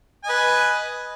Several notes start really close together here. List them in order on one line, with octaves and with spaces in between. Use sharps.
G#5 D#5 B4